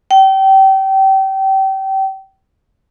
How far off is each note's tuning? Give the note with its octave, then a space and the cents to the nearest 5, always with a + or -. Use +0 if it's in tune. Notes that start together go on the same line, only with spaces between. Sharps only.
G5 -30